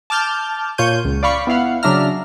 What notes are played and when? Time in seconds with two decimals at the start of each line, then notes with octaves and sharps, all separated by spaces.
0.10 A5 D6 F6 G6
0.78 A#2 F4 C#5 C#6 G6 D#7
1.05 C#2
1.23 D5 F5 B5 C#6
1.47 B3 E4 F5 F#5
1.83 C#3 F#3 D4 E5 A#5 F6